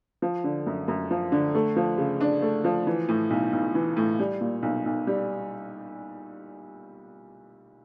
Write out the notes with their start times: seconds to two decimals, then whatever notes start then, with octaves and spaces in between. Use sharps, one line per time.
0.22 F3
0.44 D3
0.67 F#2
0.88 F#2
1.11 F3
1.32 D3
1.55 A3
1.76 F3
1.98 C#3
2.21 D4
2.42 A3
2.64 F3
2.87 E3
3.08 A2
3.30 B1
3.53 B1
3.75 E3
3.97 A2
4.19 G3
4.41 A#2
4.62 B1
4.85 B1
5.07 G3